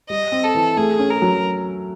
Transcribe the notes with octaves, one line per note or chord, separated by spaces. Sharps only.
G3 D#5
C4
A4
E3
A3 G#4
C#4
A#4
F#3